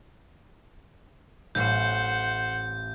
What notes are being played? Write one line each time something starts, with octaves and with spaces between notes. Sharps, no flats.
A1 A2 C5 F#5 G6